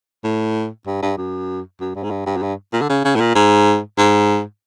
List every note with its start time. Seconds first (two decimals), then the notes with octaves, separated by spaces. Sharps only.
0.24 A2
0.87 G2
1.02 G2
1.17 F#2
1.80 F#2
1.95 G2
2.03 G#2
2.11 G2
2.26 G2
2.37 F#2
2.42 G2
2.73 A#2
2.82 D3
2.89 C#3
3.05 C#3
3.16 A2
3.20 A#2
3.35 G#2
3.98 G#2